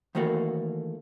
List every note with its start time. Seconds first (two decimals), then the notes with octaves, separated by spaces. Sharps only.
0.15 D#3 E3 A3 A#3 F#4 A4